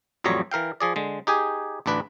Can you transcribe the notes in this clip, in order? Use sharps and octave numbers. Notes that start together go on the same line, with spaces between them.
A1 F2 F#3 G3 C#5 A#5
E3 A#4 F5 G5
F3 G#4 D5
D3 G#3
D#4 G4 G#4 G#5
A1 D2 D4 B4